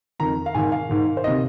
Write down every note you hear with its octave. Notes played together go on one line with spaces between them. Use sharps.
F2 D#3 A#5
F5
G#2 D#3 G#5
F5
G#2 D#3
C5
C3 D#3 D#5